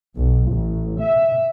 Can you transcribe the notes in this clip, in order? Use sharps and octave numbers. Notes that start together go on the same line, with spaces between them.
B1
A1
E5